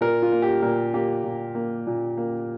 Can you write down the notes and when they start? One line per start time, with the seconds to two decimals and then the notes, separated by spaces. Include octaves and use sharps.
0.01 A#2 A#4
0.22 F4
0.32 A#3
0.42 G4
0.62 A#2 A#4
0.94 A#3 G4
1.24 A#2
1.55 A#3
1.87 A#2
2.18 A#3